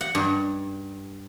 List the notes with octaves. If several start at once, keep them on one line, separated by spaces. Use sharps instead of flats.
F#5
G2